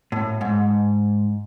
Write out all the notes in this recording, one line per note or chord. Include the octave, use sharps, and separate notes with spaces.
A2
G#2